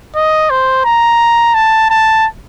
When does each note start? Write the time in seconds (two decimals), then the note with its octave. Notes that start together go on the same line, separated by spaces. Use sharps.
0.16 D#5
0.50 C5
0.85 A#5
1.55 A5
1.90 A5